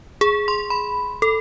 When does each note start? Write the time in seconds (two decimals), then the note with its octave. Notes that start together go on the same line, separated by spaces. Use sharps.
0.21 G#4
0.48 C6
0.70 B5
1.22 A4